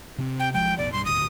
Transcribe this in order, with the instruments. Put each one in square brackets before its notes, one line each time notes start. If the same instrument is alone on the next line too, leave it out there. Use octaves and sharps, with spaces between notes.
[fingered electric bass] C3 C4
[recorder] G5
[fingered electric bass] B1 F3 G#3 [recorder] G5
[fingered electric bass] F1 A#1 B2 [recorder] D5
[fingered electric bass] B1 G2 [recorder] C6
[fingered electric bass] D#1 G#1 D2 [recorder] D#6